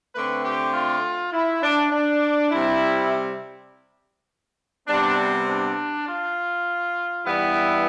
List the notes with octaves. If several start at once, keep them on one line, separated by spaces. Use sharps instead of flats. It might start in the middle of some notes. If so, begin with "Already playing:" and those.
D3 A3 C4 B4
G4
F4
E4
D4
D4
C3 G3 C4 E4
C3 G3 B3 D4
C4
D4
F4
G2 E3 G3 B3 E4